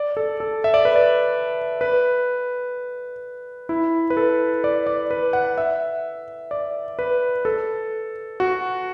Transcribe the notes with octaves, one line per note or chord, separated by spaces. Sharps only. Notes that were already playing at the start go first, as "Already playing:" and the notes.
Already playing: D5
A4
A4
E5
D5
B4
D5
B4
E4
B4
A4
D5
D5
B4
F#5
E5
D5
B4
A4
F#4